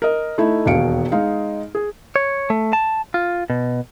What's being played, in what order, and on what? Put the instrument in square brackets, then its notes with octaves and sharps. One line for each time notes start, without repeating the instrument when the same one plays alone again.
[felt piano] A#4 D#5
A3 D#4 E4
E1 D#2 B2 F5 C#7 D7
G#3 D#4 F5
G#4
[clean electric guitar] C#5
A3
A5
F4
B2